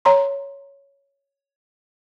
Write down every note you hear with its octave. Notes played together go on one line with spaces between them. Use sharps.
C#5 A#5 C6